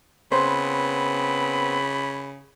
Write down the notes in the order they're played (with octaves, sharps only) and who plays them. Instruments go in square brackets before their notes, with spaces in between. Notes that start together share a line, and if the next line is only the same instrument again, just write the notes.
[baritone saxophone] C#3 [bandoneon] B3 C4 B4 [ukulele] C5 [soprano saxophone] B5